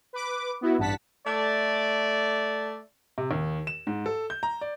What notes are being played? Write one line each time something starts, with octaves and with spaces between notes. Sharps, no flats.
B4 D6
B3 E4 F#4
A1 G2 F#5 A5 B6
A3 D5
C3
D#2
E7
G#2
A4
G6
A#5
D5